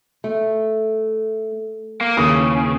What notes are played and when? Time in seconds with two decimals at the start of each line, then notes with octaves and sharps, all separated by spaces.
0.24 A3
2.01 A#3
2.17 D#2 C#3 E3 G#4 D#6